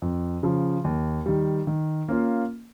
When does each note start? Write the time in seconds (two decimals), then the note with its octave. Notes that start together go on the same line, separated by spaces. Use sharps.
0.02 F2
0.43 C#3 F3
0.84 D#2
1.26 D#3 G3
1.67 D#3
2.09 A#3 C#4 F4